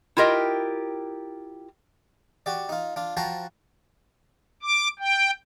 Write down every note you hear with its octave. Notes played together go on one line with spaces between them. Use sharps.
E4 F4 G4 A#4 D#5
F#4 G4 D5
D#4 F4
D4 F4
F3 F#4 C5 G5 A5 A#5
D6
G5